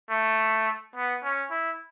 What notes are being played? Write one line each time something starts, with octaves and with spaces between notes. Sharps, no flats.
A3
B3
C#4
E4